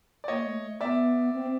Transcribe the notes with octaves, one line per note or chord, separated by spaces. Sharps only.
D5
A#3 C#5 D#5
A3
B3 D5 E5
C4